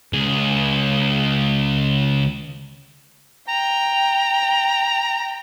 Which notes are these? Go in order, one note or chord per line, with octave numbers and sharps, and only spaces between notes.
C#2 G#4
G5 A#5